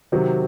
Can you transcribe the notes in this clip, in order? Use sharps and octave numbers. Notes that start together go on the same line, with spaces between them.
C3 D#3 F#3 C4 F#4